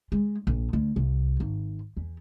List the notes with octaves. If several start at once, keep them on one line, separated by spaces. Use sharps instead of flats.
G#3
A#1
D2
C2
G#1
E2